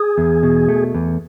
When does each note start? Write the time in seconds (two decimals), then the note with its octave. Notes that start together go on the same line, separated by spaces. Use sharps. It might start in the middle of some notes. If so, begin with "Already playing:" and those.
Already playing: G#4
0.18 E2
0.43 B2
0.68 A3
0.94 E2